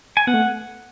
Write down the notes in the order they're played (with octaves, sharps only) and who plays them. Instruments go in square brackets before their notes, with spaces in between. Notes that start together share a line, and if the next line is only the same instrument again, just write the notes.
[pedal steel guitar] G#5
[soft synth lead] B3 [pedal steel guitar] F#5
[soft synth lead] A3